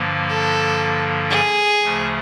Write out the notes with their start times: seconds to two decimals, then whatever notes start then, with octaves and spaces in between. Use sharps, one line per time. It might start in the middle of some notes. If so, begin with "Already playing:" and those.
Already playing: G2 D3 F3 A#3
0.29 A4
1.30 G#4
1.81 D2 C#3 F3 A3